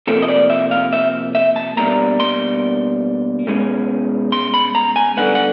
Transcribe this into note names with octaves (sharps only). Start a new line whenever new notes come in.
C3 F3 A#3 A4
D#5
D5
E5
F5
E5
E5
A5
B2 G3 A#3 D4 A#5
C6
B2 G#3 C#4
C6
B5
A#5
G#5
G2 D3 F#3 B3 F#5
F#5